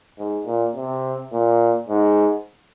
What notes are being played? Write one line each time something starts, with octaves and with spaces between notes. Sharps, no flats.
G#2
A#2
C3
A#2
G#2